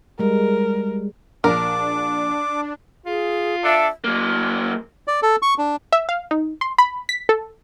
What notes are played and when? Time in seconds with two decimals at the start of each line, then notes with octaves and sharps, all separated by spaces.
0.19 G3 G#3 A#4
1.44 A#1 D4 A#4 D6
3.06 F4 G#4
3.64 D4 A4 E5
4.04 F#3 A#3
5.07 D5
5.23 A4
5.42 C#6
5.58 D4
5.92 E5
6.09 F5
6.31 D#4
6.61 C6
6.78 B5
7.09 B6
7.29 A4